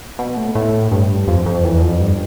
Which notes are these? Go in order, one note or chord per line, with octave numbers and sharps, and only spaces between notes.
B2
A2
A2
G2
F2
F2
E2
F2
G2